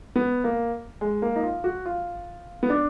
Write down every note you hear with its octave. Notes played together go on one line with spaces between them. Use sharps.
B3
A#3
G#3
A#3
D#4
F4
F#4
F4
B3
D4